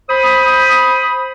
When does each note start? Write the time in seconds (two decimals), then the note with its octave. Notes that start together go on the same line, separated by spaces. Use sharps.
0.09 C5 B5 D#6